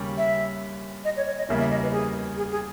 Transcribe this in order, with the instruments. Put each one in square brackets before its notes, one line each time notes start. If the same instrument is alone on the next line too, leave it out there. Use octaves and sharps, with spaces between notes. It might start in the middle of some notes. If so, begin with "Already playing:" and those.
Already playing: [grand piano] D#2 C#3 G3 C#4 G4
[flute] E5
D#5
C#5
C#5
D#5
[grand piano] E2 C#3 G3 A#3 [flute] E5
[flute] E5
D#5
B4
G#4
G#4
G#4